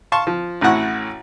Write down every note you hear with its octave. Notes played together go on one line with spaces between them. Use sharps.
F5 A5 C6 C#6
F3
A1 A2 E4 F#4 F#5 C#6